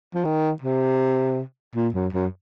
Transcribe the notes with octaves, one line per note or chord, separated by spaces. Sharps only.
F3
D#3
C3
A#2
F#2
F#2